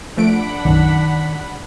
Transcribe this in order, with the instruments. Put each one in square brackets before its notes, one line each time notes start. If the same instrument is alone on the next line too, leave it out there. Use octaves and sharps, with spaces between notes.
[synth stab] F3 A3 D7 [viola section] D4 F#5 B5
[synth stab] B1 F#2 [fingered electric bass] D#3